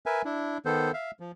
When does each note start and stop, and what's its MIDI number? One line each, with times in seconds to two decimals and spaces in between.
0.06 0.22 70
0.06 0.22 71
0.06 0.22 76
0.06 0.22 80
0.25 0.58 62
0.25 0.58 64
0.65 0.92 51
0.65 0.92 59
0.65 0.92 69
0.65 0.92 72
0.94 1.11 76
0.94 1.11 77
1.20 1.32 53